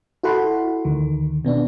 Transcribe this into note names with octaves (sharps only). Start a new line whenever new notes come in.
E4 F#4 A4 F#5 B5 C6
D2 D#3
B2 B3 D4